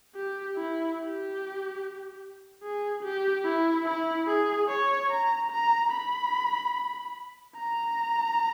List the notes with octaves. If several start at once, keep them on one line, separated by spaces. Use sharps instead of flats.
G4
E4
G4
G#4
G4
E4
E4
G#4
C#5
A#5
A#5
B5
A#5